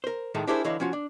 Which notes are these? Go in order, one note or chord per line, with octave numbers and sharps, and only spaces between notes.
A#4 C5
A2 D#3 G#3 A3
D4 E4 G4 G#4 A#4 C5
D3 E3 E4 C#5 D#5 F5
F3 C#4 F4 F#4
D4